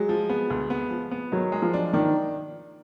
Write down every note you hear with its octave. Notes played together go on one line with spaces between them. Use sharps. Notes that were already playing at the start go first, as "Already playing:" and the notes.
Already playing: F#3 G#3
F3
B3
D2
B3
F3
B3
D#3 F#3
G#3
F3
D4
D#3 D4